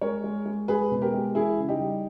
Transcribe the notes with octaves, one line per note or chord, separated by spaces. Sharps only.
G#3 A#4 C#5
G#3
G#3
G#3 G#4 B4
B2
G4 A#4
G#3
E3 E4 G#4
C#3
D#4 G4
G3